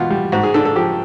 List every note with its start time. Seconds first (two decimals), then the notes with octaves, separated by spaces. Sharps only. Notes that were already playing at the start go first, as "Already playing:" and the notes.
Already playing: E2 B2 F4
0.10 G3
0.32 G#2 F#4
0.43 G#4
0.54 D4 A4
0.65 A4
0.76 F3 G4